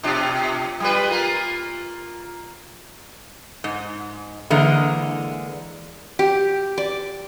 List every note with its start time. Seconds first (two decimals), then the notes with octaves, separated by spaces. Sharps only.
0.03 B2 D4 F4
0.80 G3 F4 B4
1.11 A#3 F4
3.64 G#2
4.50 D3 E3 G#3 A#3
6.19 G4
6.78 D5